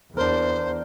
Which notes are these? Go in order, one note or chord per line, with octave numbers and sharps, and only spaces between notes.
E2 D4 A#4 C5